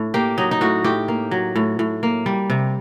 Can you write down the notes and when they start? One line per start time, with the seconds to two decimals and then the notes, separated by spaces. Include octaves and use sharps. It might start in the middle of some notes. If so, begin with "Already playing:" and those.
Already playing: A2 D4
0.14 A#3 G4
0.38 F#3 D#4
0.51 D#4
0.61 A2 F#4
0.84 A2 G4
1.08 A#3
1.31 F#3
1.56 A2
1.79 A2
2.03 A#3
2.26 G3
2.50 C3